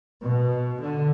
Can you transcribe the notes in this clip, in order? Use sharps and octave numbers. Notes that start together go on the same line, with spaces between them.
B2
D3